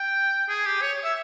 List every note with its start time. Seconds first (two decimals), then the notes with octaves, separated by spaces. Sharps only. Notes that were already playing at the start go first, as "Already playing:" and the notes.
Already playing: G5
0.49 G#4
0.66 G4
0.82 C#5
1.04 E5